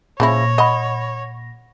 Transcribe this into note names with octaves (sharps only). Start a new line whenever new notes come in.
A#2 C#3 F3 E4 C#5 A#6
D#5 F#5 B5